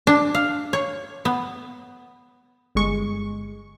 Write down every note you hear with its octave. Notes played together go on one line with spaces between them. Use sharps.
D4
F5
C#5
B3
G1 G#3 C#6